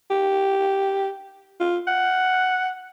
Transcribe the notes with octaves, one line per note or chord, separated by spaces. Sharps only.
G4
F4
F#5